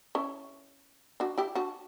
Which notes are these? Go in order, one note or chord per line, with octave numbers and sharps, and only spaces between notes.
C#4 E4
D4 F#4
E4 G4
D4 F#4